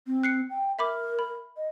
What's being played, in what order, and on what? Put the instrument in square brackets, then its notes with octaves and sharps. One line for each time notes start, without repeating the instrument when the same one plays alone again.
[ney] C4
[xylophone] F#6 C7 C#7
[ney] G5
[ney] A#4 [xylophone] E5 B5 D6
[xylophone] B5
[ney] D#5